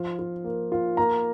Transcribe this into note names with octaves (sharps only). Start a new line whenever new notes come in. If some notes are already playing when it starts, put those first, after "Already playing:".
Already playing: F3 F4
F4
A#3
F4
A#3 A#5